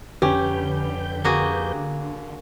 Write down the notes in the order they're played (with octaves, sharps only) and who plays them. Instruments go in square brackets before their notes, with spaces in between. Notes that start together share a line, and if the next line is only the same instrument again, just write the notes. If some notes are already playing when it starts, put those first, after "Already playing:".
[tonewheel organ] F2 B4 G6 [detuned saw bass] D3 [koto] C#4 [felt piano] G4
[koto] A#3 F#4 G#4